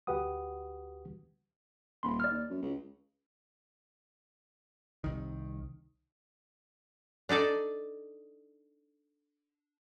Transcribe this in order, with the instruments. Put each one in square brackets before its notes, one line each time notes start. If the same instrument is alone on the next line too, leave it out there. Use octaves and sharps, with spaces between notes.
[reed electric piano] D2 F#4 G4 B4 F#5 D#6
[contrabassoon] D#1 [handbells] B5 C6
[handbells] D5 F6
[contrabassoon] D#2
F#2
C#2
[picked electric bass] C2 D#3
[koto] D4 D#4 A4 D5